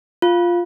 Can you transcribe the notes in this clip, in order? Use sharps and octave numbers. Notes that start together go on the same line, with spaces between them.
F4